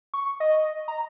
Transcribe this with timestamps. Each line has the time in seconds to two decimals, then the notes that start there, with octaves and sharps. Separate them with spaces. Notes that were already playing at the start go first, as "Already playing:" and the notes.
0.14 C#6
0.40 D#5
0.88 A#5